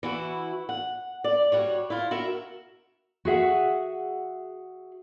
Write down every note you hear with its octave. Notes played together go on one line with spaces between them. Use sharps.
E3 E4 F#4
F#5
D5
G3 F#4 C#5
E4 F4
F#4 A#4 E5
F#4 G#4 E5 F#5